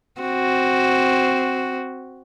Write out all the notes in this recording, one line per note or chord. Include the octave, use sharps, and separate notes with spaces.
C4 F#4